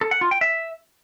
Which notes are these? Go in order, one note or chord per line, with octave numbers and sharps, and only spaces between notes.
A4
F#5
F4
G5
E5